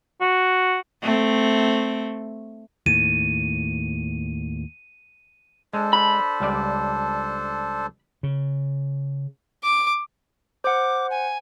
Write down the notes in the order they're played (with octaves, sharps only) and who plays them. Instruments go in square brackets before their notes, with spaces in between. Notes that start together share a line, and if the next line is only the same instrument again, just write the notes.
[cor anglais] F#4
[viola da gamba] A3 C4
[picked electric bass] D#2 A2 [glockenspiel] D#7
[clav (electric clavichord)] G#3 [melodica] D4 A4 C5
[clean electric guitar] B5
[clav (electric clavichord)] C#2 G3 D5
[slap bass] C#3
[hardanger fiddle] D6
[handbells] C5 F#5 [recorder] D6
[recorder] G#5